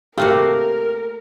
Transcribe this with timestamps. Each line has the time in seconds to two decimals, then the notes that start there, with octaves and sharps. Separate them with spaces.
0.18 C3 A3 A#3 F#4 G4 A#4 F5